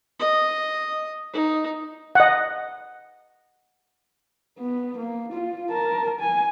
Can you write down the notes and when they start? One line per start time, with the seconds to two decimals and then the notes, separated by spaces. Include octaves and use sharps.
0.20 D#5
1.33 D#4
2.15 D#5 F#5
4.59 B3
4.98 A#3
5.33 F4
5.70 A#4 A5
6.20 G#5